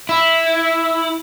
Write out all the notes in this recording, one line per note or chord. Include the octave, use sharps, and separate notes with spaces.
E4